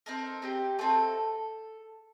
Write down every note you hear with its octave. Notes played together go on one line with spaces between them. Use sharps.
C4 D#4 A4 A#4
C4 D#4 G4
A3 C4 D#4 A4